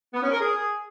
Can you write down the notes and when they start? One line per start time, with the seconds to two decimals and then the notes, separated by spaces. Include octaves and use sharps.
0.13 B3
0.22 C#4
0.31 A#4
0.41 G#4